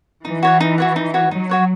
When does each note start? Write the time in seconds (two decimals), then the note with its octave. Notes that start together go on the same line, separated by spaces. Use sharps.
0.25 E3 D#4
0.43 F#4 C#5 F#5
0.60 D#4
0.78 F#4 C#5 F#5
0.96 D#4
1.14 F#4 C#5 F#5
1.31 F#3 D#4
1.49 F#4 C#5 F#5